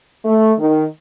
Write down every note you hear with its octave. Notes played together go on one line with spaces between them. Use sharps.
A3
D#3